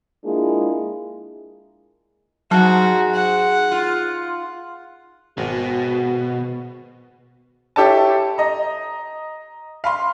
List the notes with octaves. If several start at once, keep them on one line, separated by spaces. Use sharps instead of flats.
G#3 A#3 D4 E4 F4 G#4
G#2 F#3 F#4 A5
F#5
F4
G#1 B2 F#4
E4 G4 A4 C#5 A5
D#5 A#5
F5 B5 C6